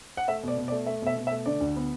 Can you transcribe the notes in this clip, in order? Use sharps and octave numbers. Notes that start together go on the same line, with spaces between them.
F#5
A3 E5
B2 D5
B2
D5
A3
A3 E5
B2 E5
B2
E5
A3
D3 D5
D2
B3